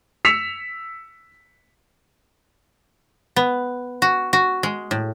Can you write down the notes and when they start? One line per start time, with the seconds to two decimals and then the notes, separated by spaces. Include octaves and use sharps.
0.25 E6 B6 C#7 E7 F7
3.36 B3
4.02 F#4
4.33 F#4
4.63 G#3
4.91 A2